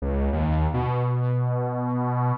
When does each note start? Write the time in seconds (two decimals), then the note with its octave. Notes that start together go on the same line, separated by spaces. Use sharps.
0.02 C#2
0.33 D#2
0.74 B2